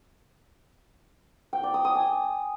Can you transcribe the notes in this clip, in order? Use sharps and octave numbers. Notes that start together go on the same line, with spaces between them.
G5
D5
D#6
D#6
G#5